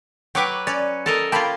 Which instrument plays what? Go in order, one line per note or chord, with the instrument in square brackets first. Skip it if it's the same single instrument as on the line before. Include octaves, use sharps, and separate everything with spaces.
[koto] F#3 B4 [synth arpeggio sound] G5 C#6 D6
[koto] C#4 [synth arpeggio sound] D5
[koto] A4 A#4 D#5
[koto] A#3 F4 [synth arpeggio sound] G5 A5 B5